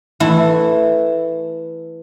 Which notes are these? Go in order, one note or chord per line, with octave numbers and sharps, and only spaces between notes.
E3 A3 E4